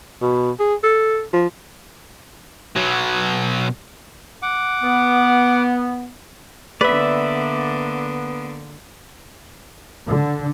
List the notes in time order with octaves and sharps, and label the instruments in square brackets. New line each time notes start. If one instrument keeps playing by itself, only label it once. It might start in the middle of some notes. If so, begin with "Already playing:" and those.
[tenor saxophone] B2
G#4
A4
F3
[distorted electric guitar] B2 F#3
[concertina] F#5 D6
[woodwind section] B3
[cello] D3 A#3 [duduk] B3 [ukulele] B4 [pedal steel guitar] D5 E5
[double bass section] D3